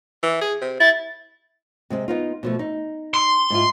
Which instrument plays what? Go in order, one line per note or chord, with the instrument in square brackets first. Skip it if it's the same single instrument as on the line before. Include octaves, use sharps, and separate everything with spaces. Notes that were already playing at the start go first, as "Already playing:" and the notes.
[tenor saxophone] E3
G#4
C3
[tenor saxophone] E4 [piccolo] A6
[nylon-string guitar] C3 G#3 C4
B3 D#4 F4
B2 F3 A3
D#4
[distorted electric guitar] C6
[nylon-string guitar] G#2 E4 F4